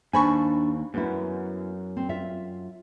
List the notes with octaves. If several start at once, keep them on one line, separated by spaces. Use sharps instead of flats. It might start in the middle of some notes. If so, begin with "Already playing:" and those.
D#2 D4 C5 G#5 B5 C#6
F#2 B3 E4
C4
F4 E5